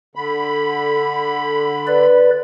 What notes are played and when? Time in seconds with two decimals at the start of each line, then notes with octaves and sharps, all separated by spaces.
0.15 D3 B5
1.87 B4 D5